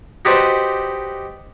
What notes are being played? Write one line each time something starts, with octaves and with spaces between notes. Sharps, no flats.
D#4 F#4 G4 B4 C5 D5